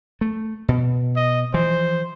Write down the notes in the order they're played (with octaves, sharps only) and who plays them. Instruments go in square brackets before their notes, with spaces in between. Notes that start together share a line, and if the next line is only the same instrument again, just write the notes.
[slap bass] A3
B2
[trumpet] D#5
[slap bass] E3 F3 [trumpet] C5